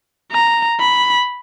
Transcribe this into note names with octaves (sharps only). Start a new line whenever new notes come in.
A#5
B5